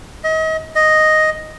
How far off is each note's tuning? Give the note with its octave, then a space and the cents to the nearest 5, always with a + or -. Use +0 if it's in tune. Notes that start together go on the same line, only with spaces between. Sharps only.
D#5 +35
D#5 +0